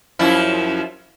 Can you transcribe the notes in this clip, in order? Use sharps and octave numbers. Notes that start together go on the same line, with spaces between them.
F#2 F3 E4